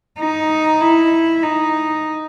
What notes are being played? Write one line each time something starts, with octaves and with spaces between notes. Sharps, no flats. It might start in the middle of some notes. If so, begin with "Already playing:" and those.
D#4
E4
D#4